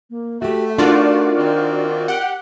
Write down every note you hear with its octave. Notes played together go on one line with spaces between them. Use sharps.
A#3
A3 F#4 G4 E5
D4 D#4 F4 F#4 A#4 D5
D#3 C4
G4 F#5